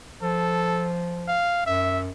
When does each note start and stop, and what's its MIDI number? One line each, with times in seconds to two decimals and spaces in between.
0.22 1.43 53
0.22 0.89 69
1.28 1.63 77
1.66 2.09 42
1.66 2.00 76